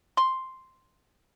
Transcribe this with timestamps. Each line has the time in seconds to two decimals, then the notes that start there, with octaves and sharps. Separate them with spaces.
0.17 C6